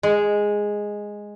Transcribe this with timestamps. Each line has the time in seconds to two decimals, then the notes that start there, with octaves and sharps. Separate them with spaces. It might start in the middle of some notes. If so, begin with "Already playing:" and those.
0.03 G#3